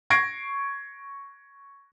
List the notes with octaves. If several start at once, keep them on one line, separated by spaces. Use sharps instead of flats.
C#6 G#6 A#6 C7 D7